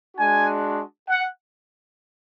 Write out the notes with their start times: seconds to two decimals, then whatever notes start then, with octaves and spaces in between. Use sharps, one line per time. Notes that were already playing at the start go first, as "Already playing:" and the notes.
0.17 G#3 D4 F#4 G#5
1.08 F#5